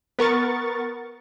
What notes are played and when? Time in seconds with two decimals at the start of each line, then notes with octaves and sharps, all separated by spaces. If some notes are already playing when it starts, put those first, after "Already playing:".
0.19 B3 A#4 C#6 A6